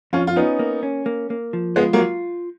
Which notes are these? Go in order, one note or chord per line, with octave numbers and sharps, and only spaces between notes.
F2 C#4 F4
F4
B3 C#4 D#4
A#3
C#4
A#3
A#3
F3
G#3 B3 F4
F#3 A#3
F4